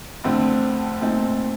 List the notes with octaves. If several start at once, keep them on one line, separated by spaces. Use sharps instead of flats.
F2 D3 A3 C4
A#2 A3 C4 D#4